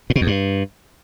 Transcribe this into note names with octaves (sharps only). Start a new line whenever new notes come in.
A2
B2
E2
G2